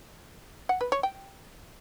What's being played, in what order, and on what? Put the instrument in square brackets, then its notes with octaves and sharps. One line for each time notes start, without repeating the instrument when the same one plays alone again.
[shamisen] F#5
B4
C#5
G5